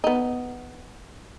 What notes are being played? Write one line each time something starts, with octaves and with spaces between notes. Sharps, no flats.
B3 D#4